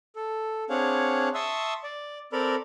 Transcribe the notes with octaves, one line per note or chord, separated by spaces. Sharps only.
A4
C4 D4 G#4 C#5 F5 F#5
E5 A5 C6 C#6 D#6 E6
D5
C4 A4 A#4 D5 A#5 B5